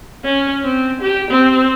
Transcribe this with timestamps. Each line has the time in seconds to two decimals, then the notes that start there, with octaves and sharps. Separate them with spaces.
0.25 C#4
0.64 C4
1.01 G4
1.31 C4